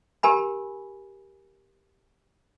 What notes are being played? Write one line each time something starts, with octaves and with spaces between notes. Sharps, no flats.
G4 A#4 G#5 B5